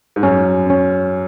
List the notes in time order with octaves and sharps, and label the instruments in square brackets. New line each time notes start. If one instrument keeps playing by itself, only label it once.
[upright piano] G#2
[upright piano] F#2 [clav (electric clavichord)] C#4
[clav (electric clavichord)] C#4